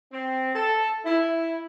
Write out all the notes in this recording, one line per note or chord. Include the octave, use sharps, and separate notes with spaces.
C4
A4
E4